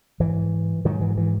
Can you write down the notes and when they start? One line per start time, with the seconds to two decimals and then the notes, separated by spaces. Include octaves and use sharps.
0.20 G#2 E3
0.85 G#2 D#3 F#3
1.01 E3
1.17 E3